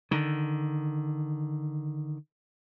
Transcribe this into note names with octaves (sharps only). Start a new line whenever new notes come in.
D3 D#3